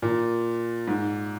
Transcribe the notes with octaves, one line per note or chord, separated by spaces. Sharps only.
A#2
G#2